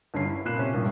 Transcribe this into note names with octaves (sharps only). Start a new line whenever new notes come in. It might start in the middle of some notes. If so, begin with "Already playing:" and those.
G1 D3 C#4 C7
E4
A#2 B5 F#6 C7 E7
C3 C#4
A#1 G2